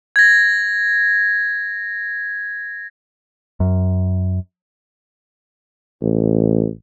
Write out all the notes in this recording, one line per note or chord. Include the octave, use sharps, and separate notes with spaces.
G#6 A#6
F#2
A1